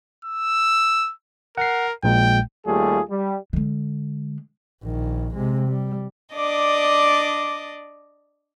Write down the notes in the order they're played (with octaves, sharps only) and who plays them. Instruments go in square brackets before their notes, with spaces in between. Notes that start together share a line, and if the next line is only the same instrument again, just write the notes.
[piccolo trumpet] E6
[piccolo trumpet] A#4 [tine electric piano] F#5 C7
[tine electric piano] A#1 A#2 G#3 [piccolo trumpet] G5
[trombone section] D#2 G3 A3 F4 G#4
G3
[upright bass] D3 G#3
[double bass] A#1 D#3
C3 G#3
G3
[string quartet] D4 D5 D#5 D6